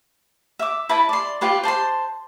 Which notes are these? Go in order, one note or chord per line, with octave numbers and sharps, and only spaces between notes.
E5 D6
E4 B4 A5 B5
D5 C6
F4 G4 B4 C6
C5 A5 B5 C6